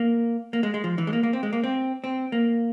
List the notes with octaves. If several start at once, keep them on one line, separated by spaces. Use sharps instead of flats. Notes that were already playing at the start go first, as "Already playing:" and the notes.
Already playing: A#3
A#3
G#3
G#3
F3
E3
G#3
A#3
A#3
C4
G#3
A#3
C4
C4
A#3